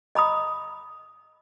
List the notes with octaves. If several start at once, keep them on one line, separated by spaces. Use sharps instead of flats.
D#5 A#5 B5 D#6